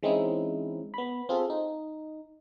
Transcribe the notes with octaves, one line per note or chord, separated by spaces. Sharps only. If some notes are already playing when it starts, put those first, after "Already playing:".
E3 G#3 C4 C#4 D#4 E4
B3 B5
C4 F4 G#4 A4
D#4